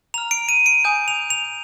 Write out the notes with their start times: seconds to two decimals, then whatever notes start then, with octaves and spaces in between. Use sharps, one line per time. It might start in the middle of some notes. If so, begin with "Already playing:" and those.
0.14 A#5 F6 F7
0.31 D7
0.49 D#7
0.66 D7
0.84 G#5 D#6 G6
1.08 F7
1.30 F7